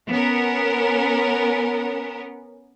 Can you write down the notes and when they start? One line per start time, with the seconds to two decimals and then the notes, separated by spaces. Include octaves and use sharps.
0.10 B3 C#4 A#4